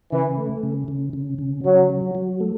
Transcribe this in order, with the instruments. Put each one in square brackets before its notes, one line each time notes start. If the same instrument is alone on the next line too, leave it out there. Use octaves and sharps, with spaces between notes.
[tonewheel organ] C#3 [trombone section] E3
[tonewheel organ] A3
C#3
C#3
C#3
C#3
[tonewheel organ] C#3 [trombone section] F#3
[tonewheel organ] F#3
F#3
A3